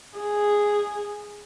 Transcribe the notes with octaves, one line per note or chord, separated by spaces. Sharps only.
G#4